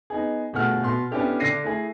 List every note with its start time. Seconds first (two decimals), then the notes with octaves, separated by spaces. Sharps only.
0.10 B3 D#4 G#4
0.53 G1 B2 A3 G#4 F#5 F6
0.83 B2 C6
1.11 B3 C#4 D4 E4 G4 A4
1.39 D3 D4 A#6 C7 D#7
1.64 A3 E4 G#4